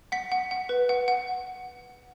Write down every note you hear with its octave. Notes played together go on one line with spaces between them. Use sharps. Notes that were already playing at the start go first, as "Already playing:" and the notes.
F#5 B6
F#5
F#5
B4
F#5
F#5